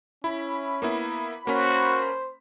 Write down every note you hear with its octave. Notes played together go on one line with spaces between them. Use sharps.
C#4 E4 B5
A#3 B3 E4
A#3 C#4 F#4 C5 B6